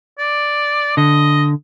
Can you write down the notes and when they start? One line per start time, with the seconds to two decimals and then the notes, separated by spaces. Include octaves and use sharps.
0.18 D5
0.97 D3 D#5